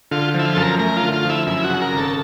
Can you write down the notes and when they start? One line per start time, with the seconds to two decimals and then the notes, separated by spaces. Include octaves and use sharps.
0.11 D3 F4
0.34 F3 E4
0.45 F4
0.55 F#2 A4
0.62 A#4
0.79 A3 A#4
0.97 F4
1.02 D3
1.13 F4
1.25 F3 E4
1.47 F#2 E4
1.64 F#4
1.70 C#3
1.82 A#4
1.92 G#1
1.97 A4